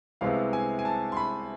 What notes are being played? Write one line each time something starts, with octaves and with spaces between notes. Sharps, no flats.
C2 C3 G#3 B3 F5
G#5
G#5
A5
C6
B5